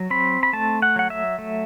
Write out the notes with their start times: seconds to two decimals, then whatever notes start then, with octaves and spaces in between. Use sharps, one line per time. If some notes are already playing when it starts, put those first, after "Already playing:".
Already playing: F#3
0.10 C4 B5
0.43 B5
0.53 A3 A5
0.82 F#5
0.96 F#3 F#5
1.10 E5
1.39 A3